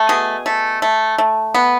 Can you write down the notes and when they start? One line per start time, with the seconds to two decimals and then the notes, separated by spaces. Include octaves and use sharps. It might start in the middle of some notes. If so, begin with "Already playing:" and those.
Already playing: A3
0.09 B2 G#4
0.46 A3
0.82 A3
1.18 A3
1.55 B3